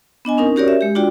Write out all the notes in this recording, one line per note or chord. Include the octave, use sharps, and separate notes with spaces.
B3 D4 D#5 G#5
C4 C#4 D#4 A#4
C#4 F#4 G4 A#4 C#5 D5
E5
G#3 G4
D4 F4 F#4 D5 G5